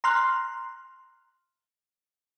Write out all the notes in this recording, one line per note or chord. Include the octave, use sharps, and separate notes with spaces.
A#5 C6 F6 F#6